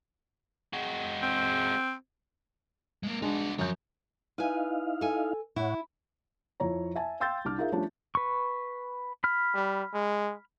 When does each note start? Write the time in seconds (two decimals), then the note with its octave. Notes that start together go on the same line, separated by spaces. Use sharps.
0.73 G#3 F#4
1.22 C4
3.03 G#3 A#3
3.22 G#3 D4 D#4 F#4
3.59 F#2 F3 C#5 G6
4.38 D#4 E4 B4 F5 G#5
5.01 A4 G#5
5.56 A2 E4 C#5 F#5
6.60 F2 F3 E4 C#5 A#5
6.95 E5 G#5 A5
7.20 F5 G5 C6 E6 G6 A6
7.45 C2 D4 D6 F6
7.58 D#4 F4 G#4 A#4 E5 F5
7.72 F3 G3 A3 C#4 D4 F4
8.15 B4 C#6
9.24 B5 F6
9.54 G3
9.94 G#3